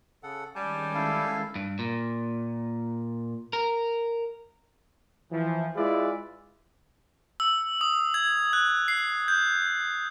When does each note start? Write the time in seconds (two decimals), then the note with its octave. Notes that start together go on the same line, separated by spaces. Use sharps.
0.23 C#3 A4 F#5
0.56 D#3 G3 G#3 C#4 G#5 A5 G6
0.95 E4 A4 F5
1.56 G2
1.79 A#2
3.53 A#4
5.32 E3 F3
5.76 G#3 E4 F4 G#4 B4 D5
7.40 E6
7.81 D#6
8.14 G#6
8.53 F#6
8.88 C7
9.28 G6